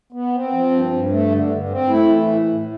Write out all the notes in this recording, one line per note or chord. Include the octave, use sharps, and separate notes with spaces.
B3
C4
F3
G2
G2
A3
D3
G2
C4
A3 E4
E3
A2
A2